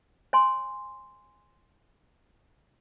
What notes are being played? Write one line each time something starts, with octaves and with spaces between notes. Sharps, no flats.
C#5 G#5 C6